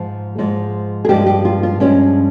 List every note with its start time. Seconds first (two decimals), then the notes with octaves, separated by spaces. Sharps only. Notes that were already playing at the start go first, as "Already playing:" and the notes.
Already playing: G#2 F3 G#3
0.38 G#2 F3 G#3
1.05 G#4
1.09 G2 F3 G#3 G4
1.27 G4
1.45 F4
1.63 F4
1.80 G2 F3 G#3 C#4